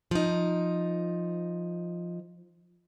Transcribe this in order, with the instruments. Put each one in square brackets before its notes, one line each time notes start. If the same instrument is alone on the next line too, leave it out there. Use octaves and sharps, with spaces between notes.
[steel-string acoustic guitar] F3 D#4